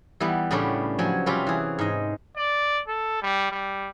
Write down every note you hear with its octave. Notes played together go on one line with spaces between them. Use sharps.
E3 G3 B3
A2 C#3 G3 B3 C#4 D4
F3 F#3 C#5 G#5
C3 G3 C#4 F4 F#4 B4
E3 G#4
G#2 D#5
D5
A4
G3
G3